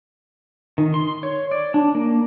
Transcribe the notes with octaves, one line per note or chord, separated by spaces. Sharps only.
D#3
C6
C#5
D5
D4
A#3